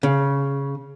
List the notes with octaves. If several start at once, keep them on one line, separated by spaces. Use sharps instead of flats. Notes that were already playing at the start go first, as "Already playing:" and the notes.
C#3